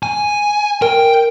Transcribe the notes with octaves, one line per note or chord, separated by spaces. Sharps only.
G#5
A#4 G5